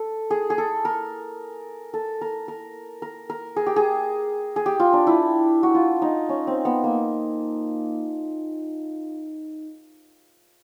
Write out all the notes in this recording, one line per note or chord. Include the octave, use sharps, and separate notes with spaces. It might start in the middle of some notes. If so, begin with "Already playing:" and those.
Already playing: A4
G#4
G#4
A4
A#4
A4
A#4
A#4
A#4
A#4
G#4
G4
G#4
G#4
G4
F4
D4
E4
F#4
F4
D#4
C#4
C4
B3
A#3